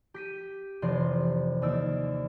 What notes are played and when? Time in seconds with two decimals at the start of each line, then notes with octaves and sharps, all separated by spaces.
0.14 G4 B6 D#7
0.82 F1 C3 E3 D5 C6
1.62 D#2 D5 E6